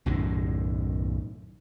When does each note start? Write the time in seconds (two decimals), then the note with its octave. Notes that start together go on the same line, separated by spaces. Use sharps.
0.06 B1 F#2 A2 D#3